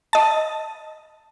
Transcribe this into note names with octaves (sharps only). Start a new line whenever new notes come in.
D#5 A5